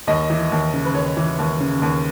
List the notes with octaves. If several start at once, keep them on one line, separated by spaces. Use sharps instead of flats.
D#2 D#5
E3
D#2
C#3
B4
D#2 C#5
E3
D#2
C#3
D#2